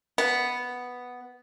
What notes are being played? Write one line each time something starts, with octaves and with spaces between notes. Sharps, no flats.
B3